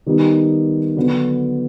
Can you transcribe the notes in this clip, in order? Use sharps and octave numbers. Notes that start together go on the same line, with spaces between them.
D#3 G3 B3 D#4 G4
D3 F#3 B3